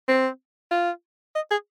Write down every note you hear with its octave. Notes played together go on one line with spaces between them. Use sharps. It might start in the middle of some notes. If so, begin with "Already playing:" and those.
C4
F4
D#5
G#4